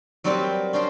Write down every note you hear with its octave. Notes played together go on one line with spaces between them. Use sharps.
F#3 G3 C4 G4 A#4 B4
C#4 D4 G4 C5 D#5